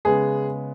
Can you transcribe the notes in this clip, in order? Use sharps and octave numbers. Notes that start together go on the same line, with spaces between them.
C#3 G#3 B3 G#4